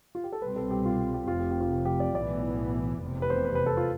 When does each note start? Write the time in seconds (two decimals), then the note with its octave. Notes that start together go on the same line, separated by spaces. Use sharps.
0.15 F4
0.24 G4
0.33 A4
0.42 C2 B2 G3 C4 B4
0.56 A4
0.71 G4
0.85 F4
0.99 G4
1.14 G4
1.28 F1 F2 C3 F4
1.39 G4
1.50 G4
1.61 F4
1.72 G4
1.85 G4
2.00 D5
2.15 B1 A2 E3 B3 D5
3.01 F1 E2 C3
3.22 B4
3.30 C5
3.45 B4
3.55 B4
3.66 A4
3.77 F4